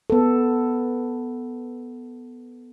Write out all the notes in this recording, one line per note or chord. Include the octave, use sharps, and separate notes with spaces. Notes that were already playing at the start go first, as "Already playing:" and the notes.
B3 A4